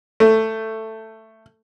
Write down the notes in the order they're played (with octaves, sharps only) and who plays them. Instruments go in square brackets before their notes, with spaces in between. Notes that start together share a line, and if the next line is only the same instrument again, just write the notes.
[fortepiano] A3